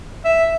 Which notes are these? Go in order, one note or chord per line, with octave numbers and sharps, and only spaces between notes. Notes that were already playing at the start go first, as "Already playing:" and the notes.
E5